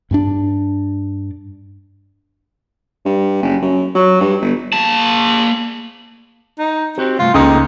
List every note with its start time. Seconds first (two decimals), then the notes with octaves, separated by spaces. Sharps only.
0.11 G2 C#4 D4
3.06 G2
3.43 F#1
3.62 F#2
3.95 F#3
4.21 G2
4.41 G1
4.73 A#3 A5
6.58 D#4
6.98 C4 F#4 G4
7.19 C2 G2 A3 F4
7.34 C#2 A#3 D#4 A4 G5 D#6